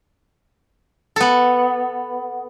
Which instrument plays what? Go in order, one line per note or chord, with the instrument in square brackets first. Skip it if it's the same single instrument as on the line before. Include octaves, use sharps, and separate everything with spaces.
[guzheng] B3 A4